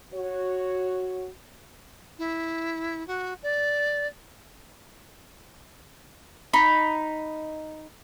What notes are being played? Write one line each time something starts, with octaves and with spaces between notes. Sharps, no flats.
F#4 C#5
E4
F#4
D5
D#4 B5